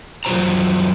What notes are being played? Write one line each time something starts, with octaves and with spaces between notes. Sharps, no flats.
F#2 F#3 F4 C5 A#5